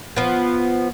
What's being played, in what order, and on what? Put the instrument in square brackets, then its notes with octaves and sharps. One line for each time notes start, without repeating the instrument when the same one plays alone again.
[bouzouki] F3 B3